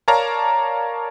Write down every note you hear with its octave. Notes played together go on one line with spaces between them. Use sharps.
A#4 C#5 D5 F5 A5 A#5